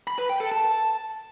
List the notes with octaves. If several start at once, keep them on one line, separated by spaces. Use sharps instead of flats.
B5
B4
G5
A4
A5